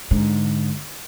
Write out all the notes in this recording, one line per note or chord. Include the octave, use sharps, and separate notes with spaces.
G#2 D3